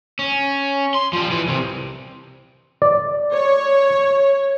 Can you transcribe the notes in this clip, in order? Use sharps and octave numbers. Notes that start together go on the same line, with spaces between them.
C#4
C6
F3 G3
E3
C2 C3
D5
C#5